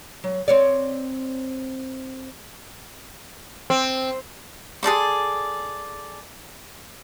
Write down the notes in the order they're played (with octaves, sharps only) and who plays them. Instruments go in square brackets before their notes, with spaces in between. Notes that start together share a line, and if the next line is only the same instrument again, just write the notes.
[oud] F#3
C4 C#5 D5
[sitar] C4
[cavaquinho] G#4 A4 D5 C6